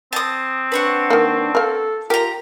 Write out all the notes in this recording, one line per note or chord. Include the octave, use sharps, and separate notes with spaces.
C4 A5 D#6
D4 B4 C#5 F#5
D#3 A#3
A4 A#4 F5
F4 G4 A#4 A#5